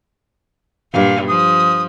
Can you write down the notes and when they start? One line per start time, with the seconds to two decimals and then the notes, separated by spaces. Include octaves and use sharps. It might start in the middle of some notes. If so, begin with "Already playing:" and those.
0.93 G2 A#2 F5
1.27 F3 D#6